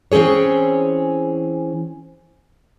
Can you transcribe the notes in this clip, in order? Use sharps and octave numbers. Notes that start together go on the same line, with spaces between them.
E3 C4 C#4 G#4 C#5